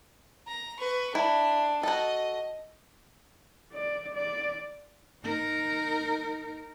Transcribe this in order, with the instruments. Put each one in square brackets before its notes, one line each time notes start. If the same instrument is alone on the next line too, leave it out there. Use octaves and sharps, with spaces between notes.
[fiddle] A#5
B4 C#6
[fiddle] D4 [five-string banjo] E4
[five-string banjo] F#4 A4 [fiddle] D#5
[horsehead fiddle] D5
D5
[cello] D#4 A#4